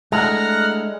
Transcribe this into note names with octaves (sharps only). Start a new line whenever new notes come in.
G#3 A3 D4 E4 F#5 A#5 F6